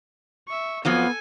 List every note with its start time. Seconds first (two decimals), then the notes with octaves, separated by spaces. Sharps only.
0.48 E5 C#6
0.85 F2 F3 F#3 B3 A4 G#5